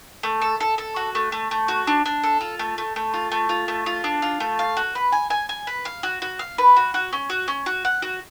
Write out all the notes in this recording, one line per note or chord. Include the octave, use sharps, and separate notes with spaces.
A3
A4
A4
A4
F#4
A3
A3
A3
F#4
D4
D4
A4
F4
A3
A3
A3
F4
A3
F4
A3
F4
D4
F4
A3
F5
F#4
B4
G#5
G#5
G#5
B4
F5
F#4
F#4
F5
B4
F#4
F#4
C#4
F#4
C#4
F#4
F#5
F#4